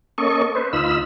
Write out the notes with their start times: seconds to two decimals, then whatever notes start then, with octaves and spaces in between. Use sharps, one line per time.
0.18 A#3 C#4 A4 D#5 C#6
0.55 B4 C5
0.73 D2 D#4 F4 B5 E6